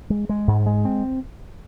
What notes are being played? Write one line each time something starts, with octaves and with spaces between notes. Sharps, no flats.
G#3
G#3
G#2
G#3
C4